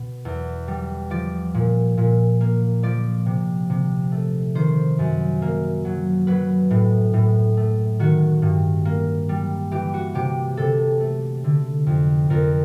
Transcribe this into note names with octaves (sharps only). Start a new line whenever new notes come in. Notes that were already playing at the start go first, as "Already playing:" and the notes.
Already playing: B2
E2
G3
F3 D5
A#2
A#2
A#3
F3 D5
C3
C3
A3
D#3 C5
F#2
A#3
F#3
F#3 B4
A2
A2
A3
D#3 F#4
G2
A#3
G3
E3 G4
F#4
C3 G4
C3 A4
A3
D3
F2
F2 A#4